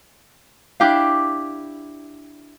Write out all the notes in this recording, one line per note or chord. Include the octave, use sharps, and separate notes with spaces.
D4 E4 G4 F5